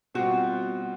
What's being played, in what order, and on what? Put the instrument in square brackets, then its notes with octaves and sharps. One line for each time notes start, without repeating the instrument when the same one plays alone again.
[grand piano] B2 G3 C4 F4 [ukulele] F#4